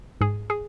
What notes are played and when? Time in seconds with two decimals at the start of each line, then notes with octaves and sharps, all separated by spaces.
0.21 G#2 G#4
0.50 G#4